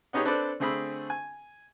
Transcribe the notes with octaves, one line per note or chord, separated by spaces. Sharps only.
B3 C#4 D#4 G4 G#4 C#5
C4 D4 A4 B4 C5 D5
D3 A3 C4 G#4 B5 E6
G#5